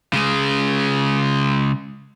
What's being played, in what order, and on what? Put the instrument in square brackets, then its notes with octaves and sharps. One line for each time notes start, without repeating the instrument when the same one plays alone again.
[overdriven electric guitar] C#3 G#3